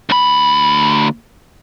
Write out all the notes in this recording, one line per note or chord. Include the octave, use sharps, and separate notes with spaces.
D2 B5